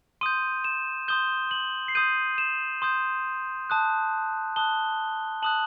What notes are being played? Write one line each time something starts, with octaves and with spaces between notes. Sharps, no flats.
C6 D#6 G6 D#7
E7
C6 D#6 G6 G7
F#7
C7
C6 D#6 G6 D#7
E7
C6 D#6 G6
A5 D#6 F#6
A5 D#6 F#6 G7
A5 D#6 F#6 F#7